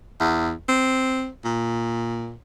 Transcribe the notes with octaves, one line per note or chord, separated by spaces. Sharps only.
E2
C4
A#2